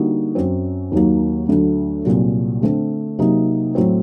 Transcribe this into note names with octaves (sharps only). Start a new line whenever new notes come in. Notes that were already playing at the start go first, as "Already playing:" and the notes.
Already playing: D3 G3 A#3 D#4 F#4
F#2 F#3 C4
D#2 D#3 F#3 A#3
D2 D3 F#3 A3
C2 A#2 F#3
D3 A3 C4
C3 F#3 A#3 D#4
A2 F#3 C4